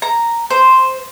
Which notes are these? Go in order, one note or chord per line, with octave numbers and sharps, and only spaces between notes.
A#5
C5